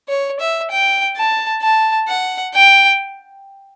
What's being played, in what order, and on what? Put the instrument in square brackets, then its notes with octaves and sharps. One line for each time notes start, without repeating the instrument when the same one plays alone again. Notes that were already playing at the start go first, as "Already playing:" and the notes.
[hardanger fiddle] C#5
E5
G5
A5
A5
F#5
G5